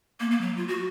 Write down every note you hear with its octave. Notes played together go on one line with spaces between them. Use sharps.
A#3
A#3
F#3
F4
F#4